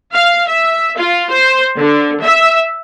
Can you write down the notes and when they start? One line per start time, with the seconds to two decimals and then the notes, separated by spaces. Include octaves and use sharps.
0.12 F5
0.48 E5
0.96 F4
1.30 C5
1.78 D3
2.22 E5